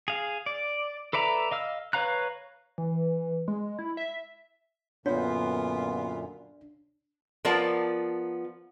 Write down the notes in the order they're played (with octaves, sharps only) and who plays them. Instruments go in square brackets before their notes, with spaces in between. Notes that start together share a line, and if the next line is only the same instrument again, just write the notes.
[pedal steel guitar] G#4 F5
D5
A4 B4 D5 E5 A#5
D#5 F5 E6 F6
B4 C#5 F5 A#5 F#6
[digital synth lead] E3
G#3
E4
E5
[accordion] F#2 A#2 D3 [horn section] B3 F4 [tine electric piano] D4 [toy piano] C#5
[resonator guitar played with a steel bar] F3 B3 F4 A#4 D5 A5